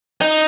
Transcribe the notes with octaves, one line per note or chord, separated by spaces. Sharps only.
D#4